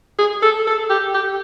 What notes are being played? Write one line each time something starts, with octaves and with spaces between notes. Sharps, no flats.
G#4
A4
A4
G4
G4